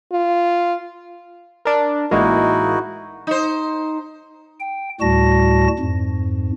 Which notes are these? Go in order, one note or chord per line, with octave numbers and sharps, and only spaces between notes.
F4
D4 A#4
A1 G#3 A#3 D#4 E4 F#4
D#4 C5
G5
D2 A2 G3 F#4 A5 A#6
F2 G#2